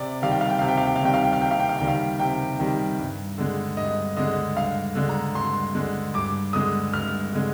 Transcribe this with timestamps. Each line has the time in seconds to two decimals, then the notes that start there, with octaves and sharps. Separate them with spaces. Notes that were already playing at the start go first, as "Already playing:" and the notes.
Already playing: C3 D5
0.22 D#3 G3 F5
0.32 G5
0.41 F5
0.49 G5
0.59 C3 F5
0.68 G5
0.78 F5
0.87 G5
0.96 F5
1.01 D#3 G3 G5
1.14 F5
1.24 G5
1.33 F5
1.41 C3 G5
1.51 F5
1.60 G5
1.69 F5
1.79 D#3 G3 G5
1.88 F5
2.19 C3 G5
2.59 D#3 G3
2.99 G2
3.38 D3 G#3
3.77 G2 D#5
4.17 D3 G#3 D#5
4.56 G2 F5
4.95 D3 G#3
5.09 A#5
5.35 G2 C6
5.75 D3 G#3
6.14 G2 D6
6.53 D3 G#3 D#6
6.93 G2 F6
7.33 D3 G#3